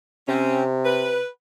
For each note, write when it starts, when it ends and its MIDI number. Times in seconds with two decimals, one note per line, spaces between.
0.28 1.19 48
0.28 0.63 60
0.28 0.63 61
0.85 1.28 71